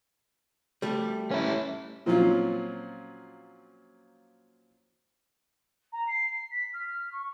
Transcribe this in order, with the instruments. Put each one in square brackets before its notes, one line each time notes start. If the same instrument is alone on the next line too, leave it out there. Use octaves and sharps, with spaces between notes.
[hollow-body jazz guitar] G3 A3
[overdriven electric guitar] C#4 E4
[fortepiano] A#2 F3 F#3 C4 C#4 F4
[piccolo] A#5
C7
B6
F6
C#6